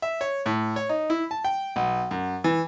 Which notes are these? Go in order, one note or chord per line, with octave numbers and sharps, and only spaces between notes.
E5
C#5
A2
C#5
D#4
E4
A5
G5
B1
F#2
E3